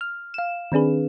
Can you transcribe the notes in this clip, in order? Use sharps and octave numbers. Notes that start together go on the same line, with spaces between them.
F6
F5 E7
D#3 C4 D4 G#4 B4